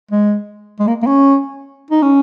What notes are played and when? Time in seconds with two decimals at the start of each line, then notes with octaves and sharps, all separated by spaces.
0.11 G#3
0.80 G#3
0.87 A#3
1.03 A#3
1.07 C#4
1.91 D#4
2.03 C#4